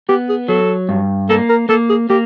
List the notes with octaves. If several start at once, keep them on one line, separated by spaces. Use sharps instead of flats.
B3 G4
G#4
F#3 A4
G2
A#3 A4
A#4
A#3 A4
G#4
A#3 G4